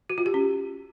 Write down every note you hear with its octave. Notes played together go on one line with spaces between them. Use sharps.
F#4
F4
G4
C#4